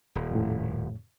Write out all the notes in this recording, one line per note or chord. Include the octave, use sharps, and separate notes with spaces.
D#1
F2 A2